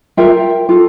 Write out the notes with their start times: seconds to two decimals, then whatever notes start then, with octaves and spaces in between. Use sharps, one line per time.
0.17 F4 A#4 E5 G5
0.69 F4 A4